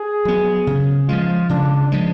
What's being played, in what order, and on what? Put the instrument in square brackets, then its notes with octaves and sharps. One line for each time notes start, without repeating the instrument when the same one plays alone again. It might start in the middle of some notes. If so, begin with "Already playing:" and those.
Already playing: [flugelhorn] G#4
[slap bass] F#3 B3
C#3
[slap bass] F3 G#3 [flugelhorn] F4
[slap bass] C#3 [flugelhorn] D4
[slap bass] F3 G#3